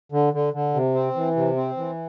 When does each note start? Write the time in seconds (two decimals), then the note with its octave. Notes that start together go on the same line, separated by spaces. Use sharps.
0.12 D3
0.33 D3
0.53 D3
0.74 C3
0.94 C4
1.15 E3
1.36 C3
1.56 C4
1.77 E3